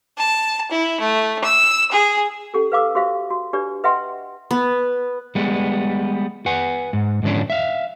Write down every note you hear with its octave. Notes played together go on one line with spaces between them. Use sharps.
A5
E4
A3
E6
G#4
C#4 G4 A4
B4 F5 D6 E6
F#4 G4 C5 E5 F5
F#4
D4 G4 B4 D5
B4 D#5 E5 F#5 G5 C6
B3
G3 G#3 B3
B4 F#5 G#5
G#2
G#2 D3 F3 C#4 D4
E5 F5